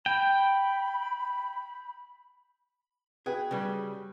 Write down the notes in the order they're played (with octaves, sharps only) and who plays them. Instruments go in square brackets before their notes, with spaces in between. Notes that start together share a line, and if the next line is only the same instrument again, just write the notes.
[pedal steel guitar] G5 [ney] B5
[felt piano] F#4 B4 G5 [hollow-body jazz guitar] G#4
[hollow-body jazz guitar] C#3 G3